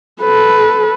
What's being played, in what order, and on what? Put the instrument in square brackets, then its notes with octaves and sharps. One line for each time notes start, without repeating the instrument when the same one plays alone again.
[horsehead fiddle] A4 B4